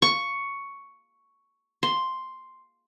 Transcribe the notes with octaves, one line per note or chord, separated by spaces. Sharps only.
C#6
C6